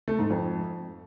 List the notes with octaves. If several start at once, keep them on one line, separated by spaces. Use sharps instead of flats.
A3
G#2
F2